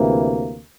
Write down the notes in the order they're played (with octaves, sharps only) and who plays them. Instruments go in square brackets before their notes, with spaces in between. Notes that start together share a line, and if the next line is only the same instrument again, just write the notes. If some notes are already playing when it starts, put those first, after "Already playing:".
Already playing: [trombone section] D2 C3 E3 A#3